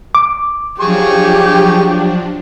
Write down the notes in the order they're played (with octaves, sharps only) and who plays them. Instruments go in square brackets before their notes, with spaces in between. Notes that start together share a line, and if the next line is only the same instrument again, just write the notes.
[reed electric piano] D6
[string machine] F3 F#3 D4 [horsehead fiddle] G4 [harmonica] G#4 C#6